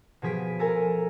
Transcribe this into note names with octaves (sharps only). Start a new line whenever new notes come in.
B2 F3 G#4 B6 D7
A4 A#4 G#5 A#5